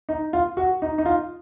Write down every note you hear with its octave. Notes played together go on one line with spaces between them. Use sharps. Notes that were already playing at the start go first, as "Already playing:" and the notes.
D#4
F4
F#4
D#4
D#4
F4